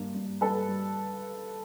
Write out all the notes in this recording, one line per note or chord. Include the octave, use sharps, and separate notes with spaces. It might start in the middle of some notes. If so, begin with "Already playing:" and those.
Already playing: G2 A#3
G2
G2 A4 B4
G3